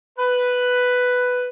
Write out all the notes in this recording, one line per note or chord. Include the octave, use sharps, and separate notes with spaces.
B4